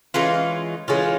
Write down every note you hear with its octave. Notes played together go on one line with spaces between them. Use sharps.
E3 G#3 C#4 F4
E3 G#3 C#4 F4